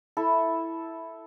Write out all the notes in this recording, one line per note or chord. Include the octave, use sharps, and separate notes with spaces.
E4 A4